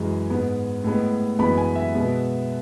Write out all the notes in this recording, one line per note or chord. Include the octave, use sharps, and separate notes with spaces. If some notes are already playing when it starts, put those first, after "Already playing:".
Already playing: F#2 E3 G#3
G#2 G#3 B3
A2 G#3 B3
F#2 E3 G#3 B3 B5
G#5
E5
B2 G#3 B3